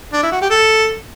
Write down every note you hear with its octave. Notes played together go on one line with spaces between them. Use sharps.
D4
E4
F#4
G4
A4